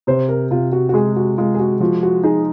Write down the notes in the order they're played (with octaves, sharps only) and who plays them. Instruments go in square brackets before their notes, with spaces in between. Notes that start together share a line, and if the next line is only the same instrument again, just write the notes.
[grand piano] C3 [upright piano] C5
[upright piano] A#4
[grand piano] C3 [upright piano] F4
[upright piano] F#4
F#4
[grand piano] G#3 [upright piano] G#4
[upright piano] F#4
[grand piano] G#3 [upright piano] F4
[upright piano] G#4
F#4
[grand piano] F3 [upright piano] F#4
[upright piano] F#4
[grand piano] D#4 [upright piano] G#4